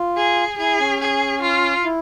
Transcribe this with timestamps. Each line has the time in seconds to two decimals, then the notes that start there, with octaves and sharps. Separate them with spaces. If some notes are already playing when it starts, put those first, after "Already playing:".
Already playing: F4
0.17 G#4
0.58 E4 G#4
0.80 C#4
1.00 G#4
1.42 F4
1.84 E4